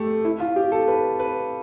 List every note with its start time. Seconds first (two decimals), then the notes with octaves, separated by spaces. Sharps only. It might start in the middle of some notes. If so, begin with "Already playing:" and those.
Already playing: A3 G4
0.25 E4
0.40 F4
0.56 G4
0.72 A4
0.88 B4
1.19 B4